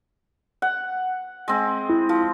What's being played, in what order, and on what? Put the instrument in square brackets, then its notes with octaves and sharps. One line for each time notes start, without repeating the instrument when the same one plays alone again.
[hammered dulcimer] F#5
G#3 C4
[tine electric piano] E4
[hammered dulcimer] F3